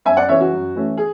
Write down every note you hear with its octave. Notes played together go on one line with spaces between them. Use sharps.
F#2 E5 G#5
D5 F#5
C#3 E3 C#5 E5
F#4
F#2
E3 A3 C#4
G#4